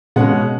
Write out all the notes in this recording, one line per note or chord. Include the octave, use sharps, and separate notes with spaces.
B2 G#3 C#4 F#5